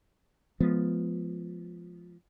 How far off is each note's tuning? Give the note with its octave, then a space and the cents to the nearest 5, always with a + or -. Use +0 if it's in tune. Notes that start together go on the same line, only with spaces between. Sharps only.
F3 +0 G#3 +35 B3 +0